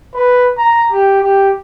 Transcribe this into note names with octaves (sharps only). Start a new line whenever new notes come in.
B4
A#5
G4
G4